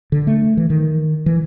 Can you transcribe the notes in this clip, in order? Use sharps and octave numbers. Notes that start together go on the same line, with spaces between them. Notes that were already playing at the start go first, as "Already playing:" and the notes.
D3
A3
E3
D#3
E3